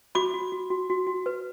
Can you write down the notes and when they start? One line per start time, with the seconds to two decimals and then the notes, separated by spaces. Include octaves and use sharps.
0.15 F#4 B5 D6
0.34 F#4
0.52 F#4
0.70 F#4
0.90 F#4
1.07 F#4
1.26 B4